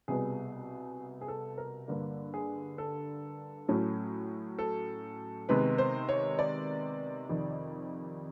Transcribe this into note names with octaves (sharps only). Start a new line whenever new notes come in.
C2 B2 G3 B3 G#4
G#4
A4
A#4
G2 D3 G3 A#3
G#4
A4
A2 F#3 A3 C#4
A4
C3 D#3 G#3 B3 B4
C5
C#5
D5
F2 C3 D#3